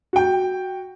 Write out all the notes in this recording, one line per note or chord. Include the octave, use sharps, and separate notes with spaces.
F#4 G5